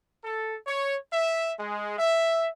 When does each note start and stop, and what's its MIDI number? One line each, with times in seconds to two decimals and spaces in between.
0.24 0.55 69
0.67 0.96 73
1.13 1.52 76
1.59 1.96 56
1.98 2.47 76